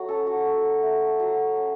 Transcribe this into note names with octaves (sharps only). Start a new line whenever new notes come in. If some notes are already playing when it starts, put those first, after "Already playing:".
Already playing: F#3 A3 F#4
C#4 A4
F#4
F#3
A3
F#3
C#4